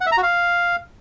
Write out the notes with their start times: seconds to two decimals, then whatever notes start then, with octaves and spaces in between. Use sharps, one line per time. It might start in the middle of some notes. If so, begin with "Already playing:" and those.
0.01 F#5
0.06 E5
0.12 A#5
0.17 F#4
0.23 F5